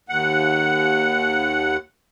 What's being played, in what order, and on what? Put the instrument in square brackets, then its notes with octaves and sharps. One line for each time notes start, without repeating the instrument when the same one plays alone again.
[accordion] D#2 F#5